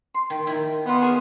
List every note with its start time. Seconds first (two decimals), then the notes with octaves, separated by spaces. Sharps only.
0.14 C6
0.30 D#3 G5
0.47 D#3 E4
0.86 B3 F4 D#5
1.02 G#4 A#4 C#5